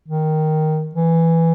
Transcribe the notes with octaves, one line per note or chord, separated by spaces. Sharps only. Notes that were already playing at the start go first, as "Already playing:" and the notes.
D#3
E3